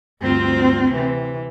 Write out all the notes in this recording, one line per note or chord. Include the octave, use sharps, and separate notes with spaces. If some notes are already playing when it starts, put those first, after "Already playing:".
D2 G2 C4 F4
C3 E3